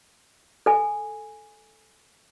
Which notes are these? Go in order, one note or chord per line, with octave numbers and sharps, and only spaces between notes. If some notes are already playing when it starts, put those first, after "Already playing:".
A4 G#5